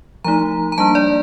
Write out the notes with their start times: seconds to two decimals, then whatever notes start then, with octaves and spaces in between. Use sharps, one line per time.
0.24 F3 A3 D#4 A#5
0.72 A#5
0.78 G3 A#3 D4 A5
0.95 D5